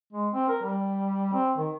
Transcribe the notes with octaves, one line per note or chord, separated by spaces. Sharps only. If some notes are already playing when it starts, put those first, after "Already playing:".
G#3
C4
A#4
G3
C4
D#3